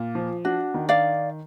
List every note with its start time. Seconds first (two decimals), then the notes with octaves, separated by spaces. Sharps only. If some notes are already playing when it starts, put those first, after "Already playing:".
Already playing: A#2 F4
0.15 F3
0.45 D4 F#4
0.74 D#3
0.89 D5 F5